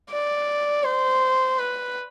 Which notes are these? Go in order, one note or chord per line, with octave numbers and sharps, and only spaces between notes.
D5
C5
B4